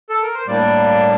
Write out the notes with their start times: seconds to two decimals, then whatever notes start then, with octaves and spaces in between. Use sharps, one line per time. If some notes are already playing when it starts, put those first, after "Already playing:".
0.10 A4
0.22 A#4
0.34 C5
0.47 A2 G3 A#3 D4 D5